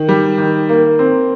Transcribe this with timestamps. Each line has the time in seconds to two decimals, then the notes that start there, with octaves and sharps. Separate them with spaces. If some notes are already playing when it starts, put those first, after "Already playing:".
Already playing: D#3
0.08 G3
0.38 D#3
0.69 A#3
0.99 C4